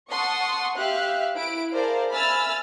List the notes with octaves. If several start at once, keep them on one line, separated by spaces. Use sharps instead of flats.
F#5 A5 C6 C#6 D#6
G4 E5 F5 F#6
E4 D7
G#4 A#4 C5 D5 F5 A5
E5 G#5 B5 E6 F6 A6